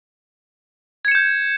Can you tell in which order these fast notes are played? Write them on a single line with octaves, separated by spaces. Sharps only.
G#6 C#7 E7 G6